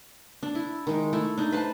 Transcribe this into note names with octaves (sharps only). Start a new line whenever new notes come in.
D4
E4
D#3 G#3
A3 E4
D4 D#4
B4 C5 A5